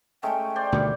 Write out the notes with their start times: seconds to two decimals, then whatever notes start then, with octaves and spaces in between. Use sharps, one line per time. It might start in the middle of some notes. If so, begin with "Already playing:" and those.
0.23 G#3 A3 C#4 G5
0.56 C5 D5
0.72 D2 B2 D#3 G3